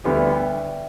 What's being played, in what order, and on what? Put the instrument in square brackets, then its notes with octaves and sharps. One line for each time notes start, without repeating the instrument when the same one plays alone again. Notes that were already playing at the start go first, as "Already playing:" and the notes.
[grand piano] D2 D3 G3 B3 G4 [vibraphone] E5
[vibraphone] D5
G5
G5